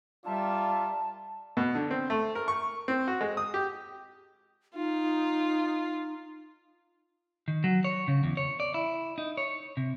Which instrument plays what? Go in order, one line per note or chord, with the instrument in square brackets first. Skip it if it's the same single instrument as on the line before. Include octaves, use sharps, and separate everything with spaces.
[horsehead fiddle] G3 E5 [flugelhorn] F4 [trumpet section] A#4 D5 [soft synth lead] A5
[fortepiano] B2
D3
C4
A3
A#4
C#6
C4
F#4
G#3
D#6
G4
[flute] D#4 [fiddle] F4
[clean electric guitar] D#3
F#3
C#5
C#3
E2
C#5
D5
E4
D#4
C#5
C3